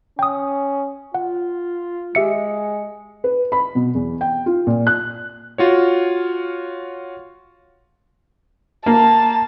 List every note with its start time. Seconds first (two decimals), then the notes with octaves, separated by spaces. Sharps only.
0.19 C#4 G5 D#6
1.15 F4 F#5
2.15 G#3 G4 E5 C#7
3.24 B4
3.52 B5
3.75 B2
3.95 E2
4.21 G5
4.46 F4
4.67 A#2
4.87 F#6
5.58 F4 F#4 C#5
8.86 A#3 A5